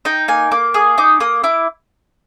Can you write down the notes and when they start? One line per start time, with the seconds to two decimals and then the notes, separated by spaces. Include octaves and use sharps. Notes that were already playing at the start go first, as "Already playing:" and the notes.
0.05 D#4 G5
0.28 A#3 G#5
0.51 A#3 D6
0.74 G#4 D#6
0.98 D#4 D6
1.20 A#3 D#6
1.44 E4 D6